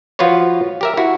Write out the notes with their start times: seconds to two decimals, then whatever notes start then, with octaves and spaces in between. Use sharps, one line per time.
0.19 F3 F4 F#4 B4 C#5
0.81 G4 A#4 E5
0.97 E4 F#4